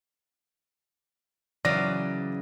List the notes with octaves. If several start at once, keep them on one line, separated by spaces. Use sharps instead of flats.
C#3 E3 F#3 D5 A#6